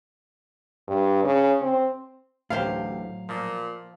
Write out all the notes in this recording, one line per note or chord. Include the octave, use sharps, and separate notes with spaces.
G2
C#3
C4
A1 D2 A2 F#3 G4 C5 F5
A#2 F3